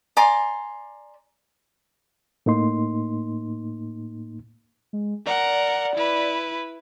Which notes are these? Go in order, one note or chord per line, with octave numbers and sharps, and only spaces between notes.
D5 G#5 A#5 C6
A2 A#3 D#4 C6
G#3
A#4 D5 F#5
E4 B4